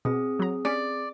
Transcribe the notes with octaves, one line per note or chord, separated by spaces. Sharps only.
B2 C4 G#4 D#6
F#3 A#5
C#4 D5 B6 C#7